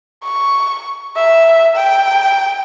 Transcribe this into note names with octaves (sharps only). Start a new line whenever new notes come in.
C#6
E5
G5